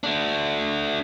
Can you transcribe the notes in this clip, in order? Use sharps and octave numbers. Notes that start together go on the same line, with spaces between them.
A3 D4